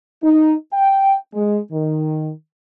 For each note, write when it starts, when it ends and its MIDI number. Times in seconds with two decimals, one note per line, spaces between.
0.24 0.53 63
0.73 1.15 79
1.34 1.57 56
1.72 2.31 51